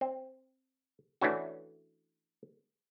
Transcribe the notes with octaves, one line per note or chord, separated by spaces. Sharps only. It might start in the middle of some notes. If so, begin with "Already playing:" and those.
C4
E3 A3 C#4 D4 F#4